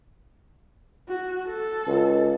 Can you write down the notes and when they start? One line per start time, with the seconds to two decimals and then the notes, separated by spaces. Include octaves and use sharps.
1.09 F#4
1.48 A4
1.87 C#2